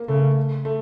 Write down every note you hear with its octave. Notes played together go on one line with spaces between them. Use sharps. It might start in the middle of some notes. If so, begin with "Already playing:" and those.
Already playing: A#3
C#3 A3
A3